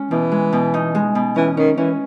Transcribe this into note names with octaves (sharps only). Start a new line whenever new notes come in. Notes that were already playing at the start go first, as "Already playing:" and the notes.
Already playing: G#3 C#4
B2 E3
G#3
B2
D#4
G#3
B2
E3 C#4
D#3 C#4
E3 C#4